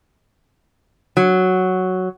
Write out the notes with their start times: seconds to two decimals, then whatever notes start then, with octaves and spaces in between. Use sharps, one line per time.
1.17 F#3